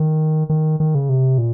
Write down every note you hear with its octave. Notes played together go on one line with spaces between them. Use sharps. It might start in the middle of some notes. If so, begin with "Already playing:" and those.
Already playing: D#3
D#3
D#3
C#3
C3
A#2